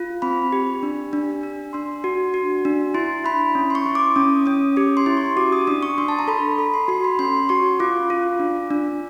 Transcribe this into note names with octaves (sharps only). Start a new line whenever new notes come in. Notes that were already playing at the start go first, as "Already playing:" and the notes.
Already playing: F4
C4 B5
G4
D4
D4
D4
D4 C6
F#4
F#4
D4
E4 C6
E4 B5
C#4
C6
C#6
E4
D6
C#4 D#6
C#4 D#6
G4 D6
C6
E4
C#6
F#4 D6
D#6
D4 D#6
C#6
D4 C6
A5
A#5
A4 B5
A4 B5
C6
F#4 C6
B5
C#4 C6
F#4 C#6
F4 D6
F4
D4
D4